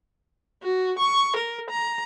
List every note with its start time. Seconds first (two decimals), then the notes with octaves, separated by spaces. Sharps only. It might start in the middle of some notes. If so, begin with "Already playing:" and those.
0.63 F#4
0.99 C#6
1.36 A#4
1.71 A#5